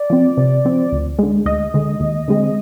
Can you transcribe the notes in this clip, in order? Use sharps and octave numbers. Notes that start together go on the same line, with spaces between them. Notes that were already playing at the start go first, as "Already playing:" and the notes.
Already playing: D5
F3 C4
C3
F3 C4
D2
D3 G#3
D2 D#5
D3 G#3
D#2
D3 G#3 C4